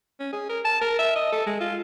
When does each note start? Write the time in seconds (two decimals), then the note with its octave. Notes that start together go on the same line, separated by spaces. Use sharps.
0.20 C#4
0.33 G#4
0.49 A#4
0.65 A5
0.81 A#4
0.99 E5
1.16 D#5
1.32 A4
1.47 G#3
1.60 F4